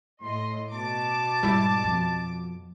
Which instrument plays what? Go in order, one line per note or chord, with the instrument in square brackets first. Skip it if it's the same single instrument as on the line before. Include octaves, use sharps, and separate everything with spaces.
[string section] A2 D#5 [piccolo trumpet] C6
[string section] B2 D6 [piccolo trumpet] A5
[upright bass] G#2 [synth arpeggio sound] G3 E4
[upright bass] F2